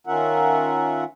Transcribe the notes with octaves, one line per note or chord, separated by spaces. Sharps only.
D#3 C#4 F4 A#4 E5 F#5